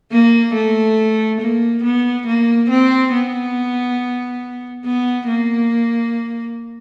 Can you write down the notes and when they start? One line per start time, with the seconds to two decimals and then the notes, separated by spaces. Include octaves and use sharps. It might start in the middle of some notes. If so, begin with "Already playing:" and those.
0.11 A#3
0.54 A3
1.40 A#3
1.83 B3
2.27 A#3
2.69 C4
3.13 B3
4.85 B3
5.27 A#3